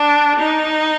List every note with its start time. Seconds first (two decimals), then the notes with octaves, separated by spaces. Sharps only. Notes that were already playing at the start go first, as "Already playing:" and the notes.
Already playing: D4
0.39 D#4